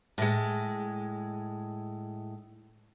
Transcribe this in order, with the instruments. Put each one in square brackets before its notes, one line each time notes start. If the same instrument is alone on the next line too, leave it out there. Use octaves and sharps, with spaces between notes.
[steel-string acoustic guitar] A2 G#3